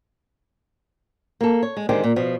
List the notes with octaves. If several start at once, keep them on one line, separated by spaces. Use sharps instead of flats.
A#3 A4
C#5
G#3
D3 D#3 G#3 C4 G4
A#2
B2 F3